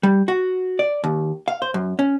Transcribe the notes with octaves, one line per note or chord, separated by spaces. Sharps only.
G3
F#4
D5
D#2
F5
C5
F#2
C#4